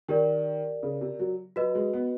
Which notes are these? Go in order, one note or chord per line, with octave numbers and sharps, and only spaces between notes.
D#3 G4 A#4 D5
C#3
C3
F#3
F#3 F#4 B4 D#5
G#3
B3